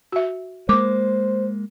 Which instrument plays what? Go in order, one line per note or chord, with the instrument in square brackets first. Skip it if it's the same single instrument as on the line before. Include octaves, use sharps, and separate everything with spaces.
[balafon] F#4 E5
[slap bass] G#3 A#3 [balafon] A#4 D6 [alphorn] C5